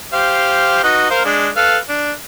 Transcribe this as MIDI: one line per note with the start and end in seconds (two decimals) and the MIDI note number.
0.13 0.83 67
0.13 0.83 72
0.13 0.83 77
0.83 1.07 63
0.83 1.07 66
0.83 1.07 71
1.10 1.22 70
1.10 1.22 72
1.10 1.22 77
1.25 1.49 56
1.25 1.49 62
1.56 1.77 69
1.56 1.77 71
1.56 1.77 77
1.89 2.12 62